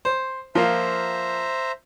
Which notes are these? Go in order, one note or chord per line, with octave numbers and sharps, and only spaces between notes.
C5
F3 A#3 C5 E5 A#5